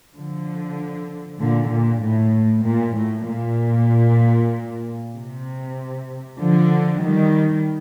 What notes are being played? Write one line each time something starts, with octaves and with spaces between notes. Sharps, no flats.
D3 F3
A#2 D3
A#2
A2
A#2
A2
A#2
C3
D3 F3
D#3 G3